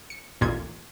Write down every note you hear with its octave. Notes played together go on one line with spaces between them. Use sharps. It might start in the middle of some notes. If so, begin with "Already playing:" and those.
C#7
A1 D#2 A#2 G#6